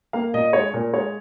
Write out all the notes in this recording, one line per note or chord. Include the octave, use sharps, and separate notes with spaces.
A#3 F5
A#2 D#5
G#3 C#5
A#2
G#3 C#5